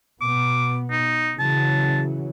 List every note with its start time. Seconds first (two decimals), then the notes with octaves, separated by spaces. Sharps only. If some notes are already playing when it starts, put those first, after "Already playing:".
0.21 B2 B3 D6
0.91 D#4
1.39 C#3 E3 F#3 A5